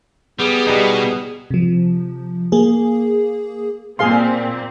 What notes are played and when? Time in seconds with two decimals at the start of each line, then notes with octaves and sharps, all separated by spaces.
0.39 G3 B3 G#4
0.67 B2 G3 D#4
1.50 C3 F3
2.52 A#3 G#4
3.99 A#2 C4 G#4 F5 C6